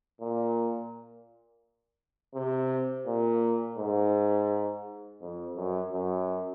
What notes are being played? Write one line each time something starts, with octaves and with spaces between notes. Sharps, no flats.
A#2
C3
A#2
G#2
F2
F#2
F#2